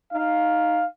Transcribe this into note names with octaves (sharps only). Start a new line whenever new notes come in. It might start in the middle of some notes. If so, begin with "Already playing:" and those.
D#4 F5